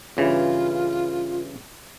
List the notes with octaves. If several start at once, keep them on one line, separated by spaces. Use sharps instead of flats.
G2 C#3 E3 F4